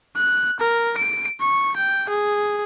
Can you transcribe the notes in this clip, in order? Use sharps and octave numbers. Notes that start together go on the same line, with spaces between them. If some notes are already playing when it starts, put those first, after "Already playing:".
F#6
A#4
D7
C#6
G5
G#4